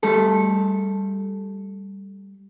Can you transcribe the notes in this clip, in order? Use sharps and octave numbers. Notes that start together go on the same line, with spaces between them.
G3 A3 A4